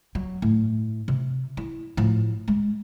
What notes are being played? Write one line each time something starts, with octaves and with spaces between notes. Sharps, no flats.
F#3
A2
C3
E4
A2 F3
G#3